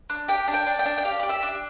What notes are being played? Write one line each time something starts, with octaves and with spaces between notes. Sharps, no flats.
D4
G4 G5
D4
G5
D4
G5
D4
G5
G4 F5
G4 D5
E5
D4